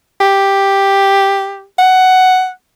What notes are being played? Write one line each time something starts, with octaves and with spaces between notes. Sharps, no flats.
G4
F#5